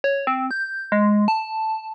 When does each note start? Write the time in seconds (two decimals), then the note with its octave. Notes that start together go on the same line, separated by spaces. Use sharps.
0.04 C#5
0.27 C4
0.51 G6
0.92 G#3
1.28 A5